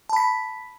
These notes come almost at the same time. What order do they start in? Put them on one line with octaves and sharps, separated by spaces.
A5 B5 B6